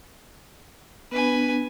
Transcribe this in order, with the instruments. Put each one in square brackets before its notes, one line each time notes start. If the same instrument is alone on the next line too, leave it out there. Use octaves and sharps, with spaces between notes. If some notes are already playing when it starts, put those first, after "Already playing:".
[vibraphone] B3 D4 [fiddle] B4 G#5